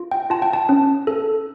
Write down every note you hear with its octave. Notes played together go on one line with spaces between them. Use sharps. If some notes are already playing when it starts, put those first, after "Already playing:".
Already playing: F4
G5
F4 A5
G5
A5
C#4
A4